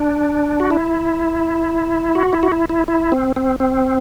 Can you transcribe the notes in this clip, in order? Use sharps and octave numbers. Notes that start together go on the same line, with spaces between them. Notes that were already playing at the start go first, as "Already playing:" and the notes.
Already playing: D4
F#4
E4
F#4
E4
F#4
E4
E4
E4
C4
C4
C4